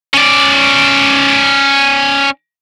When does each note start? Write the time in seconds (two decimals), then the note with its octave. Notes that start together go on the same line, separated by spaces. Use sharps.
0.14 C#4 D5